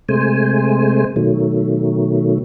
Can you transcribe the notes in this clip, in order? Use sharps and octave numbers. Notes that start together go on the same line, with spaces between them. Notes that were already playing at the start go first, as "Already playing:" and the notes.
C3 G#3 A3 C5 G#5
B2 D#3 F#3 A3